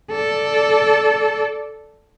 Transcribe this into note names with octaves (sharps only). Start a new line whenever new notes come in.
A4 D5